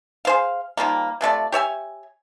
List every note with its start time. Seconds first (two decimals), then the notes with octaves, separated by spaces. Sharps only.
0.25 G#4 C5 F5
0.77 D#3 F3 G3 A#3
1.21 C3 F3 A3 D5
1.52 G4 C#5 E5 G#5